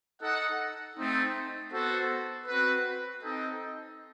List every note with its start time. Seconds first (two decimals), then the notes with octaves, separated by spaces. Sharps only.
0.21 D#4 A4 D#5 F#5
0.96 A3 C4 D#4
1.71 B3 F#4 A4 C5 F#5
2.47 C4 F#4 B4
3.22 C4 D#4 A4 D#5 G5